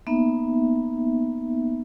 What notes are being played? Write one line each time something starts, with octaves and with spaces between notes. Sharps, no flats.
A#3 B3 D#4 E5